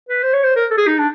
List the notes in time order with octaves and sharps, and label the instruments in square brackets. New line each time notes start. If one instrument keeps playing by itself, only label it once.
[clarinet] B4
C5
C#5
C5
A#4
A4
G#4
D#4
D4